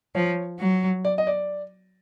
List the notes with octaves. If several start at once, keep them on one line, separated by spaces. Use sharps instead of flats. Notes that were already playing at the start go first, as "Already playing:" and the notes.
F3 C#5
F#3
D5
D#5
D5